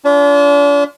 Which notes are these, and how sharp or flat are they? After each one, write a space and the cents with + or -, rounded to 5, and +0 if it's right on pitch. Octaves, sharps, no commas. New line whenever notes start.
D4 -40 F4 -25 A5 -40